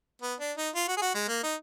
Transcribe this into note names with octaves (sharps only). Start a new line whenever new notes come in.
B3
D4
D#4
F4
F#4
G#4
F#4
G#3
A#3
D#4